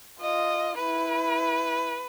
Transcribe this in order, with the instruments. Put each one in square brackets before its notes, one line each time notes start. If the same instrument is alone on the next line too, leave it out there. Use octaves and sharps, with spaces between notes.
[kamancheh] F4 [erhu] D#5
[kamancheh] E4 [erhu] B4